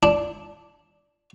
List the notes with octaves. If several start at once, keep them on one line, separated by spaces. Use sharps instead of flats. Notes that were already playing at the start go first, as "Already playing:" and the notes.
D4